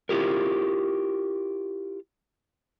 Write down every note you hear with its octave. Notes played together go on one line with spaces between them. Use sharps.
E4 F4 G4 A#4